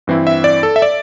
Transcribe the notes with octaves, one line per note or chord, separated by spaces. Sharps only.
G2 E3 C4 E4
E5
D5
A4
E5
D5